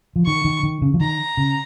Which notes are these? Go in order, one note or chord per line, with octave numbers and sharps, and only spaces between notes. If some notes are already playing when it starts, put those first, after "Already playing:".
F3
D#3 C#6
D#3
D#3
C#3
F3
D#3 A#5
C#3